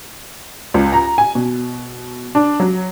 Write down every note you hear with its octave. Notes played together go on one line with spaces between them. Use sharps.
C#2
A#5
G#5
B2
D4
F#3